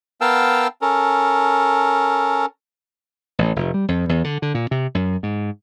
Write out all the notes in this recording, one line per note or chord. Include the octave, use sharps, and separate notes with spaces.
B3 A#4 F5 G5 A5 E6
C#4 A4 A#4
A1
F1
G3
F2
E2
D3
D3
A#2
C3
F#2
G#2